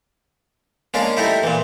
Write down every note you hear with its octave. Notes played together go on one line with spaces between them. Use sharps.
G#3 A#3 C#4 D4
G3 A3 D#4 E4
A#2 E3